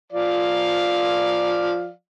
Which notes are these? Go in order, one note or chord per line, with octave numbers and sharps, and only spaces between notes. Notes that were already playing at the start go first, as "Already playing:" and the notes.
F3 D5 F5